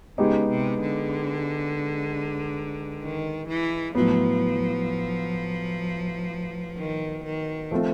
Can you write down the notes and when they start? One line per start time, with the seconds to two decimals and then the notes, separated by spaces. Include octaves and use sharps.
0.18 C#3 G#3 B3 D#4 G4
0.50 C3
0.81 D3
3.01 D#3
3.48 E3
3.95 A2 F3 F#3 B3
6.77 D#3
7.24 D#3
7.71 F3 A3 C4 F4